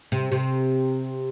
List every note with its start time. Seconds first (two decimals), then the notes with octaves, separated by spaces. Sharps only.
0.12 C3
0.32 C3